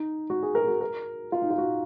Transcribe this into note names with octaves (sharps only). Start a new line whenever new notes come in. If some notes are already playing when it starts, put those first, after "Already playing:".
Already playing: D#4
F#4
G#4
A#4
G#4
F#4
A#4
F4
D#4
F4
F#4